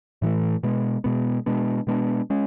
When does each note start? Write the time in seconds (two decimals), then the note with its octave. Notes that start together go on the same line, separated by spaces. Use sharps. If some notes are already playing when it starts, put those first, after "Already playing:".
0.22 A2 E3 A3
0.63 B2 G#3 B3
1.04 B2 G#3 B3
1.46 B2 G#3 B3 D4
1.87 B2 G#3 B3 D4
2.30 G#3 C#4